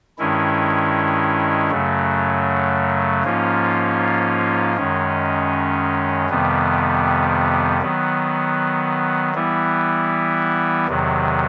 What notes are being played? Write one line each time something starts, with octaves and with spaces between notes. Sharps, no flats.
G2 D#3 G#3 C#4 E4
F#2 C#3 F#3 A3
G#2 F3 A#3 C#4 F4
F#2 D#3 G#3 C#4
F2 C3 D#3 G3 B3
D#3 F#3 B3
E3 G3 B3 E4
E2 C3 D#3 F#3